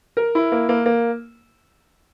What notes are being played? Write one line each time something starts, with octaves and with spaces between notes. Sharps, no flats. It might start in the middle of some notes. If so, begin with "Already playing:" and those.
A#4
E4
A#3
A#3
A#3